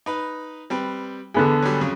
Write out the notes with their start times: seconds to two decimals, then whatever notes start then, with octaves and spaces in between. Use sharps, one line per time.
0.06 D#4 B4
0.70 G3 C4 B4
1.34 E2 D3 B3 G#4
1.62 F#3 G3
1.81 F2 C#3 F#3